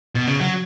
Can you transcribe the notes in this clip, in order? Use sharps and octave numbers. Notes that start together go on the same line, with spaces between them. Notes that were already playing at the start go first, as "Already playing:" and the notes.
B2
C#3
F#3